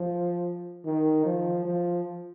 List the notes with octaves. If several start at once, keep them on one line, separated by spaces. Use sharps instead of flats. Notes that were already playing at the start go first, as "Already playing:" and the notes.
Already playing: F3
D#3
F3
F3